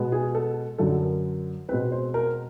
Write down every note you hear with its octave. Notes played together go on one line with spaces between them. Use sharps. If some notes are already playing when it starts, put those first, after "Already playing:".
Already playing: B2 G#3 B3
G#4
A4
F#2 D3 F#3 A4
A#4
B2 G#3 C4 B4
C5
A#4